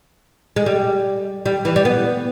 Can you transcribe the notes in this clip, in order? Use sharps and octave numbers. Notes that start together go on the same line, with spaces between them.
G#3
G3
G3
E3
G3
B3